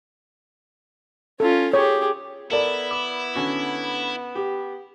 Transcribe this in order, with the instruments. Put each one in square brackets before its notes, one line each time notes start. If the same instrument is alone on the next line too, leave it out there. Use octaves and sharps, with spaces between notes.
[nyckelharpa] C#4 F4 [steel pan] A4
[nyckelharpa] G4 G#4 [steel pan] C#5
[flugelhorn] B3 [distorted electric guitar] E4 [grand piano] A4 A#4 D5
[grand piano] D6
[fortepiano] D3 C#4 F#4
G4